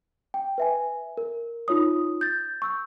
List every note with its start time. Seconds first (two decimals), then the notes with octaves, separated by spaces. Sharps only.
0.34 G5
0.58 B4 E5 G#5
1.17 A#4
1.68 D#4 F4 C#5 D#6
2.21 G6 A6
2.62 C#6 E6 G6